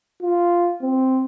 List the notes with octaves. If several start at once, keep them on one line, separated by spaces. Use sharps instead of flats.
F4
C4